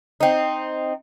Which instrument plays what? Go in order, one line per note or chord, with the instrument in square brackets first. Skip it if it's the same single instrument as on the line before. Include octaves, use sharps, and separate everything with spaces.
[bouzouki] C4 D#4